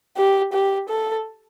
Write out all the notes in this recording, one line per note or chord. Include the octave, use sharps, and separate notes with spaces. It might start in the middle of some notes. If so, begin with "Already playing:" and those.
G4
G4
A4